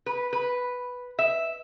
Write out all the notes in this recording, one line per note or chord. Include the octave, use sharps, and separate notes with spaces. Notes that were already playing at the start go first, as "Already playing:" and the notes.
B4
B4
E5